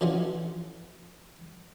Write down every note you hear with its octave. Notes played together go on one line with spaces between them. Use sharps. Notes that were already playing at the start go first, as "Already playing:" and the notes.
D3 E3 C#4 F4 F#4